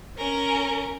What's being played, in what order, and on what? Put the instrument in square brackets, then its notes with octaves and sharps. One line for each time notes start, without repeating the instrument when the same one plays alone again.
[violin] C#4 A#4